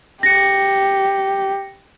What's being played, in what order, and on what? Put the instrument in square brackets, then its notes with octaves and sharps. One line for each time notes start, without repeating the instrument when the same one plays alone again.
[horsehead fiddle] G4 [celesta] A#6 C#7